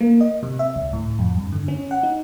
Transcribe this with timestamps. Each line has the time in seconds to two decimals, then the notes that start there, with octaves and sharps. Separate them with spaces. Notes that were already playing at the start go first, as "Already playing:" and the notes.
0.01 A#3
0.21 D#5
0.43 C3
0.59 E5
0.76 C#2
0.93 A2
1.19 F2
1.35 G2
1.52 D3
1.68 C#4
1.91 F#5
2.03 D#4